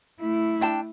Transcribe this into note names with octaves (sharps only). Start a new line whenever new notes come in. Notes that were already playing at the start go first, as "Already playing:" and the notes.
A3 E4
D4 G5 A5